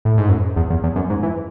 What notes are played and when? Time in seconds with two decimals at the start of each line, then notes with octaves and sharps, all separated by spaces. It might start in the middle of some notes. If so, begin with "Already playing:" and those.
0.05 A2
0.18 G#2
0.29 F#2
0.56 E2
0.70 E2
0.83 E2
0.96 F#2
1.10 G#2
1.23 E3